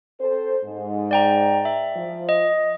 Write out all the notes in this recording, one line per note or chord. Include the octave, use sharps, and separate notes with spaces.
C4 A4 C5
G#2
D5 G5 A#5
E5
F3
D#5